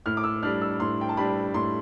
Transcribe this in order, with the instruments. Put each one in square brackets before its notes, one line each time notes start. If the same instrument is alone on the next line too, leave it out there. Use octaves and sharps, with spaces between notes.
[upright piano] A2 F6
D6
E6
G3 D4 F6
E6
A2 C6
G5
A5
G3 D4 B5
A2 C6